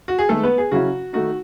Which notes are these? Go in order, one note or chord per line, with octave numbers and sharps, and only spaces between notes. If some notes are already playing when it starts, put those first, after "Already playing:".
F#4
G#4
D#3 G#3 A3 B3 A4
B3 B4
G#4
C#3 F#3 C#4 E4 F#4
D#3 A3 D#4 F#4